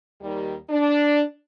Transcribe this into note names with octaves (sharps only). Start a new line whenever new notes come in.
D#2 D#3 G3
D4